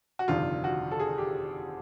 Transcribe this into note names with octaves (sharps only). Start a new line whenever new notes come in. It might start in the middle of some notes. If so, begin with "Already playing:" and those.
F#4
G1 F2 C3 D#3 G3 F4
F#4
A4
G#4
G4